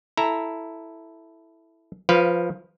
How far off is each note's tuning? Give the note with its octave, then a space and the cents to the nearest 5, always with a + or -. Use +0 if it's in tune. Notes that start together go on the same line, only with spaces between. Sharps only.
E4 +0 A4 +0 A#5 +0
F3 +5 B4 +0 F5 -15